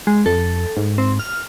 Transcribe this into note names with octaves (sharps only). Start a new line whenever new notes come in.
G#3
F2 A4
G#2
C4
F6